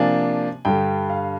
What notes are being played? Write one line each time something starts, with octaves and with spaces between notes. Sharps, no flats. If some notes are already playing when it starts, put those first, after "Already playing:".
Already playing: C3 F3 A#3 D4 G#5
G2 D3 G3 G5
F5